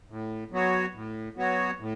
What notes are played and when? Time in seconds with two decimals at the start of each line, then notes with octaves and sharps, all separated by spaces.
0.10 A2
0.51 F#3 B3 F#4 C#5
0.95 A2
1.37 F#3 B3 F#4 C#5
1.80 A2